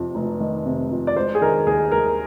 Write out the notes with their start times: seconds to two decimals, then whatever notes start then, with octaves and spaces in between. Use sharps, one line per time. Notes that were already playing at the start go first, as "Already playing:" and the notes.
Already playing: F2 C3
0.15 F1
0.40 D#3
0.66 C3
0.91 F2
1.07 D5
1.16 G#3 C5
1.35 G#4
1.42 D#3 A#4
1.66 D#2 G#4
1.92 D#2 A#4